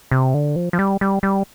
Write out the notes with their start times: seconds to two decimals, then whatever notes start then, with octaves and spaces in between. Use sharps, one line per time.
0.11 C3
0.34 D3
0.56 F3
0.73 F3
0.79 G3
1.01 G3
1.23 G3